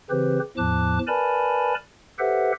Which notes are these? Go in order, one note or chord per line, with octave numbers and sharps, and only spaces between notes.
C#3 E3 C4 G4 B4 C5
E2 A2 F3 A5 D6 F#6
A#4 B4 D5 G#5 A5 B5
G4 A4 B4 C5 E5 F#5